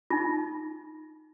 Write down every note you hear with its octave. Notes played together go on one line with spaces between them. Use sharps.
D#4 F4